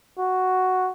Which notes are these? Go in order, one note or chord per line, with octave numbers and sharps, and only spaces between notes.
F#4